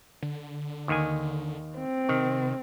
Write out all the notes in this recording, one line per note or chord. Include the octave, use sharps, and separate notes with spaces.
D3
D#2 D#3 G#5
C4
C3 D#3